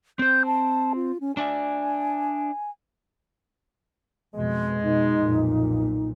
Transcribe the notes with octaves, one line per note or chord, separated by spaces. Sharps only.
C4 C5 G6
A5
F4
C#4
D4 D5 E5 G#5
F2 B2 G#3
B2 D#4
B1 F2 A#2